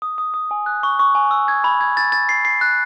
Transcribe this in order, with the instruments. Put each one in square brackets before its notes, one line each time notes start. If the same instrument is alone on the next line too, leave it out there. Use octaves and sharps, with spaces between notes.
[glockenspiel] D#6
D#6
D#6
G#5
F#6
C#6
C#6
G#5
E6
G#6
B5
G#6
A6
A6
C7
C7
F#6